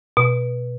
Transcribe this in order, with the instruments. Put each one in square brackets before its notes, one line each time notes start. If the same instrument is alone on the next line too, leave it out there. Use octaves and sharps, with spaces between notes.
[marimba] B2